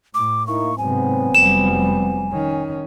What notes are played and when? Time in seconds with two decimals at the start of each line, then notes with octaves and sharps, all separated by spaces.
0.14 A2 D6
0.47 A#3 D#4 E4 C#6
0.78 G#2 C3 F#3 B3 C4 G#5
1.35 F1 G3 E7
2.32 D#3 C#4